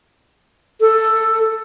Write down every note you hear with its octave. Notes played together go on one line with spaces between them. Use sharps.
A4